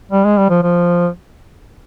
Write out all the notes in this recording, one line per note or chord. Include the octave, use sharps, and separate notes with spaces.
G3
G#3
G3
F3
F3